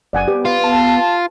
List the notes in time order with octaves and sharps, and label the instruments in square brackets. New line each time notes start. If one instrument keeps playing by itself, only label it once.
[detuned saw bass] F#1 [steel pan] D5 F#5 G#5
[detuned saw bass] B3 [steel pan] G4
[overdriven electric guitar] F4 [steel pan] B4
[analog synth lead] A5